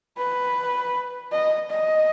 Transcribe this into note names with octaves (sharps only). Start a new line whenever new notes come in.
B4
D#5
D#5